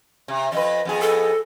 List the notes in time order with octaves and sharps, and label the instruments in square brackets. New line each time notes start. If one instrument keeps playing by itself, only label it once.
[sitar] C3
[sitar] F2 B4 [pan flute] D#5
[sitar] F2 B3 G#4
[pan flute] A4